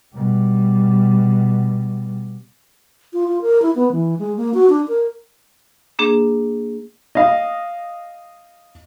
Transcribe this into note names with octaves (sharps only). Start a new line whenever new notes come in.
B2 G3
F4
F4
A#4
E4
B3
E3
G#3
A#3
F#4
D4
A#4
A#3 D4 G#4
D#5 F5